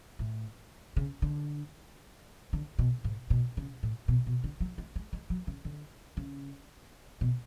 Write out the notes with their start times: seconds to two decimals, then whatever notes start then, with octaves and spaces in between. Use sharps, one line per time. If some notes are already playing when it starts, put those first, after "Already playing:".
0.19 A2
0.97 C#3
1.22 D3
2.53 D3
2.79 B2
3.04 G#2
3.30 B2
3.57 C#3
3.83 A2
4.08 B2
4.26 B2
4.44 D3
4.60 F#3
4.78 G#3
4.96 G#3
5.13 G#3
5.30 F#3
5.47 C#3
5.65 D3
6.17 C#3
7.21 B2